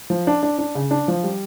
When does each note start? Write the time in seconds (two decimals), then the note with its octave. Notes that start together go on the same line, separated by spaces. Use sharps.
0.10 F3
0.27 D4
0.43 D4
0.59 D4
0.75 C#3
0.91 D4
1.08 F3
1.23 G3